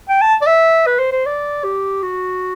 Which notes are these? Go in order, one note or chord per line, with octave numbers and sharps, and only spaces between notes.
G5
A5
D5
E5
B4
C5
C5
D5
G4
F#4